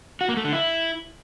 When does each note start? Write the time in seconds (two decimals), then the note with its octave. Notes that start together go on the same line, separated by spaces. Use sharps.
0.21 F#4
0.29 A#3
0.37 A3
0.45 D3
0.53 E4